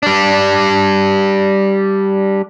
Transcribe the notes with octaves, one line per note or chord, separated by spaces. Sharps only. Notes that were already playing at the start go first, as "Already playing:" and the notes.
G3 D4